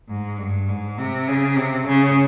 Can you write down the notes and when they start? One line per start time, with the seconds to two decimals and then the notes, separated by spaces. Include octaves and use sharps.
0.09 G#2
0.38 G2
0.68 G#2
0.98 C3
1.28 C#3
1.57 C3
1.87 C#3